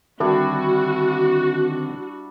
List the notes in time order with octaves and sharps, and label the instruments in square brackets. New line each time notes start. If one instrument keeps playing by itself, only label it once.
[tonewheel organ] D3 D#3 C4 [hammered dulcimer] G3 D4 E4 [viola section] F#4